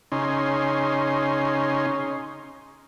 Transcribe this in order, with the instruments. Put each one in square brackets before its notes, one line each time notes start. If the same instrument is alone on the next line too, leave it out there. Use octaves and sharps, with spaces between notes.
[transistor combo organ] C#3 C#4 D#4 C6